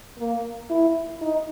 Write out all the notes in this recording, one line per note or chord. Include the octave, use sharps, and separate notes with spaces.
A#3
E4
D#4